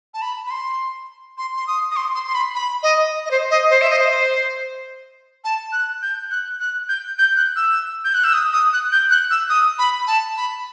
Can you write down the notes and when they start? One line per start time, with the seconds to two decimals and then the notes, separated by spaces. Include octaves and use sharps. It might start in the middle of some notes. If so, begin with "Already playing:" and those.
0.14 A5
0.22 B5
0.47 B5
0.51 C6
1.38 C6
1.56 C6
1.67 D#6
1.91 D#6
1.96 C6
2.15 C6
2.27 C6
2.35 B5
2.55 B5
2.83 D#5
3.26 D#5
3.31 C5
3.51 D#5
3.70 C5
3.82 E5
3.90 D#5
3.99 C5
5.44 A5
5.72 F#6
6.02 G6
6.31 F#6
6.60 F#6
6.89 G6
7.19 G6
7.37 F#6
7.56 E6
8.05 G6
8.14 F#6
8.24 E6
8.34 D#6
8.53 D#6
8.73 F#6
8.92 G6
9.11 F#6
9.31 E6
9.50 D#6
9.79 B5
10.07 A5
10.37 B5